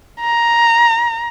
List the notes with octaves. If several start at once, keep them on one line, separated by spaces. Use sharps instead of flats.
A#5